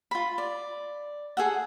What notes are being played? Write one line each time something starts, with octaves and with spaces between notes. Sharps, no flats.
F4 B5
D5
G#4 A4 F#5